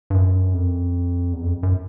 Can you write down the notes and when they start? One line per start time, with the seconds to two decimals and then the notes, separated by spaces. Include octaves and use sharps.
0.10 G2
0.14 F#2
0.54 F2
1.33 E2
1.43 F2
1.63 F#2